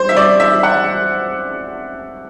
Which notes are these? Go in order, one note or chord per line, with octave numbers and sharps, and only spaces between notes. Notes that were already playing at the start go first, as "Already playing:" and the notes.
Already playing: C5
E5
D5
E5
F#5